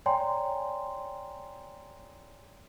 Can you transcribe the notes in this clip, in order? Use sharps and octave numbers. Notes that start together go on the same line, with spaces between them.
C#5 D5 G5 G#5 A#5 C6